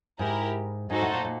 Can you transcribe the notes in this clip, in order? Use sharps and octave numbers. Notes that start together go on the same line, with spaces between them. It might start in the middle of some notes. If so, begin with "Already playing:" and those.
G#2 E4 G4 A#4
G#2 D#4 F#4 A4 C5
A2
A#2
A#2